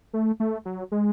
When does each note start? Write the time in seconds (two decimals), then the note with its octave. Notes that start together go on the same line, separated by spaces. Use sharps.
0.13 A3
0.40 A3
0.65 F#3
0.92 G#3